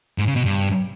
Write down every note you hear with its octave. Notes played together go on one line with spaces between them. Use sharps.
G#2
C#3
B2
G2